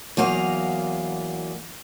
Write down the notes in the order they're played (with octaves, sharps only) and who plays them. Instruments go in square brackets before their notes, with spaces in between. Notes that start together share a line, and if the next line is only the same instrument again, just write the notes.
[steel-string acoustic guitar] E2 F#3 A#3 D#5 F5